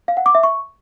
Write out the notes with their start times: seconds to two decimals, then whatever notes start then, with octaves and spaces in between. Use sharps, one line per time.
0.08 F5
0.17 F#5
0.26 D6
0.35 E5
0.43 C#6